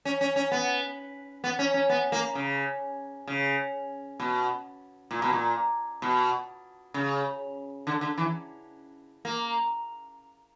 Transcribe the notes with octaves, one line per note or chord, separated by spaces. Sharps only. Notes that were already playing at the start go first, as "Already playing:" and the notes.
C#4
C#4
C#4
B3
B3
C#4
C#4
B3
A#3
C#3
C#3
B2
A#2
B2
A#2
B2
C#3
D3
D3
E3
A#3